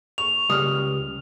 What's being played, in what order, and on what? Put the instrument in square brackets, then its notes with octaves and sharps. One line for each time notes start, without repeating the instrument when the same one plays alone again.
[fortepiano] C#6 [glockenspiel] F7
[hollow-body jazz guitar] C#2 G3 [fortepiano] D#6 F6